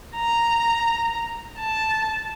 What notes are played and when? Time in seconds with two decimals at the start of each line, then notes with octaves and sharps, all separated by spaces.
0.16 A#5
1.59 A5